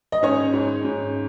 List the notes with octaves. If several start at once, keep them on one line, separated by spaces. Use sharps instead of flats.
D#5
G#2 C#4 C#5
G#2
G#2